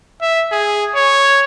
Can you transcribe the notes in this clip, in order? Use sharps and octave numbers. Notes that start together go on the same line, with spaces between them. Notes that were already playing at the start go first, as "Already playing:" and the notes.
E5
G#4
C#5